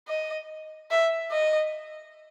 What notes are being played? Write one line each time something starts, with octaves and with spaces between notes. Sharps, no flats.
D#5
E5
D#5